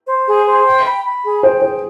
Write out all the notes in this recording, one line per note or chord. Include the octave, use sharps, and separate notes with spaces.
C5
G#4
C5
G5
B5
B5
G#4
C5 G5
G#4 C5